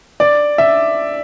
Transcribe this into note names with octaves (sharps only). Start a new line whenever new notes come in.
D5
E5